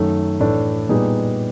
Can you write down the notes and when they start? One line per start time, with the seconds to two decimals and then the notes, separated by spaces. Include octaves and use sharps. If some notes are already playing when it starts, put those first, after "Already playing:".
Already playing: F#2 D#3 F#3 A3
0.40 A2 E3 A3 D4
0.89 A#2 G3 B3 D#4 G#4